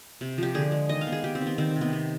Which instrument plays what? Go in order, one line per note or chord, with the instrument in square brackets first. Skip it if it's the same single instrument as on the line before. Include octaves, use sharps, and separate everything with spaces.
[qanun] C3
F3 G4
D3 G#4
G#3
D#3 D#5
F5
B3
G#4
B3 G4
C4
D#3
B3
D#3 C4
C4
C3
B3
B3